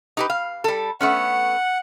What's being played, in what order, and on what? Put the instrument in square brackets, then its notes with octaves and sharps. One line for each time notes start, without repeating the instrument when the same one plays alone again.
[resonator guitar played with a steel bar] D#4 G4 B4
F5
G3 A4
[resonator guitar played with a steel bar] A3 B3 C#4 [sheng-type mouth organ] F#5